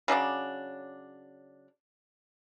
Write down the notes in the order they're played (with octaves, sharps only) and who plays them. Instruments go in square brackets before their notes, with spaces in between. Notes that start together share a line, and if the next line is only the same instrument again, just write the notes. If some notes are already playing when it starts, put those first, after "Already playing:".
[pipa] C#3 F#3 D4 D5